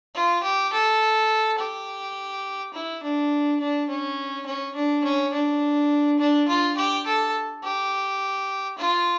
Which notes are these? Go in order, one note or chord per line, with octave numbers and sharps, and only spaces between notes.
F4
G4
A4
G4
E4
D4
D4
C#4
C#4
D4
C#4
D4
D4
F4
G4
A4
G4
F4